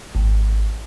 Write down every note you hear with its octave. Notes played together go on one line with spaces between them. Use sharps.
G#1